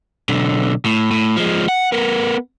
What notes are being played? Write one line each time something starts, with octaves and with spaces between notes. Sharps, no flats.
B1 D3
A2
A2
F3 G#3
F#5
B3 A#4